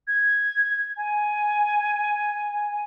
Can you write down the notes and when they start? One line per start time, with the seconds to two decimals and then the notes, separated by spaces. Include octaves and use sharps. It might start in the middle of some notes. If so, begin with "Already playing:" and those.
0.08 G#6
0.97 G#5